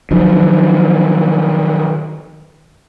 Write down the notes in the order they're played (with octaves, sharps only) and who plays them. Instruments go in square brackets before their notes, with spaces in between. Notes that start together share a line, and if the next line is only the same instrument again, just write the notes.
[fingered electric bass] D#3 F3 F#3